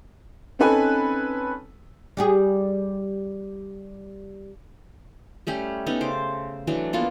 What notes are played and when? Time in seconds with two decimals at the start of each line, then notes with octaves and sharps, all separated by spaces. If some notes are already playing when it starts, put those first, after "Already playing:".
0.59 C4 C#4 D#4 A4 B4 G#5
2.17 G3 G4 G#4
5.47 G3 A3 C#4 G4
5.86 B3 C#4 D#4 A4
6.01 C#3 C5 D6
6.67 E3 F#3 A3 D4
6.93 A#3 B3 F4 A4